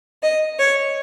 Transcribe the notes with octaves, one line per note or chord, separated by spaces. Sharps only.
D#5
C#5